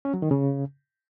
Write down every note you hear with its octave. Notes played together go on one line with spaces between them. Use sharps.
C#4
F#3
D#3
C#3